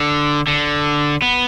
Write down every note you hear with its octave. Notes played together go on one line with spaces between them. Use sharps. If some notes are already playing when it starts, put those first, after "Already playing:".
Already playing: D3
D3
B3